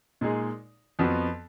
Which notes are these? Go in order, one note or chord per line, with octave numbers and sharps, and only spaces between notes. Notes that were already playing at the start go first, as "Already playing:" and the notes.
A#2 G#3 D#4 G#4
F2 F3 B3 F#4